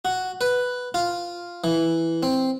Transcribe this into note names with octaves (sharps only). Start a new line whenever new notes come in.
F#4
B4
F4
E3
C4